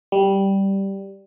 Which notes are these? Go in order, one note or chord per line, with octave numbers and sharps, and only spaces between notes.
G3